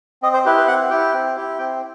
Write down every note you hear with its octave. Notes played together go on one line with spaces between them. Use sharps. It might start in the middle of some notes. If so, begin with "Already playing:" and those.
C4 D#5
C5
E4 G4 B4
B4
C4 F#5
E4 G4 G5
C4
E4 G4
C4 G5